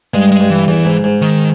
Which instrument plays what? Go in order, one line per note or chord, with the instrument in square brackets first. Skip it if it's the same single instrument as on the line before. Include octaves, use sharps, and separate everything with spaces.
[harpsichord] G2 [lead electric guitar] G#3
[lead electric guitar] G#3
[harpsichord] G2
[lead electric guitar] E3
[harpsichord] E2 [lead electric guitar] E3
[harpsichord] G#2
G#2
[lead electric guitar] D#3